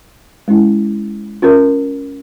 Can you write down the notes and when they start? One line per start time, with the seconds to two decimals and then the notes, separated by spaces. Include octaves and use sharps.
0.48 G#3 C#4 E4
1.42 C#4 F4 A#4